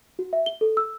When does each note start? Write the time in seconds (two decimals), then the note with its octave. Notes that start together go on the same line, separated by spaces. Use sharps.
0.19 F#4
0.33 E5
0.46 G7
0.61 A4
0.77 E6